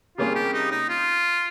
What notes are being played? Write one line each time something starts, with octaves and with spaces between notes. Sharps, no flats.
C3 G3 A#3 C#4 F4 G#4
G4
D#4
D#4
F4